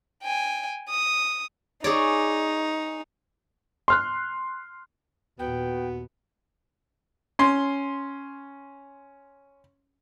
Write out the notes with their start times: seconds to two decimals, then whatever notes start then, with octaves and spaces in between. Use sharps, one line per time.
0.24 G5 G#5
0.89 D#6
1.84 D#4 G#4 C#5 D5
3.88 C6 F6 F#6
5.39 D#2 A#2 B3 F#4 G5
7.39 C#4 C6